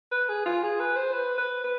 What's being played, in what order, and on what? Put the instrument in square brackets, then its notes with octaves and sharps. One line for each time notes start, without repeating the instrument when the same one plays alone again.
[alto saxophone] B4
G#4
F4
G#4
B4
C5
B4
B4
B4